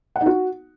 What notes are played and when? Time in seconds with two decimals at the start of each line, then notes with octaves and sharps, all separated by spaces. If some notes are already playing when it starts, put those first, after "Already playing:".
0.16 F#5
0.21 D#4
0.26 F#4